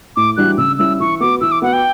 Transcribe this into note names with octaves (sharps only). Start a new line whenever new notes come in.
A2 D6
E3 G3 D4 F#4 F#6
C#3 E6
G3 C#4 E4 E6
E3 C#6
B3 F#4 D6
E3 E6
D6
B3 F#4 F#5
G5